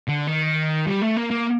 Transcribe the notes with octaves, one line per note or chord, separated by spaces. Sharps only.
D3
D#3
G3
A3
A#3
A#3